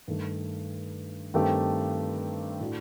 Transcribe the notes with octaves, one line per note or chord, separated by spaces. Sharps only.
G2 D#3 A3
G2 D#3 A3 C4 G4
A2 A3 D4 F#4